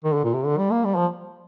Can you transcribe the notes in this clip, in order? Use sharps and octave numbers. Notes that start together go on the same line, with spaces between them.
D#3
D3
A#2
C3
D3
G3
A#3
G3
F3